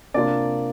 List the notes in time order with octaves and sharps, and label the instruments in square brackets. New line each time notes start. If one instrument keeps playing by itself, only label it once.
[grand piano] C3 A#3 D4 F4 D5